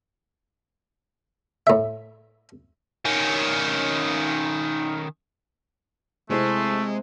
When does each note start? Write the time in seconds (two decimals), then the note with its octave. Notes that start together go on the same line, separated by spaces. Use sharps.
1.67 A2 E5
3.05 D#3 C#4
6.30 C3 G#3 A3 C4 E4